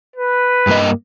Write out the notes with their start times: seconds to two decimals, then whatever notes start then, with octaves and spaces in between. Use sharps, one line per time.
0.16 B4
0.67 G2 A#3 D#5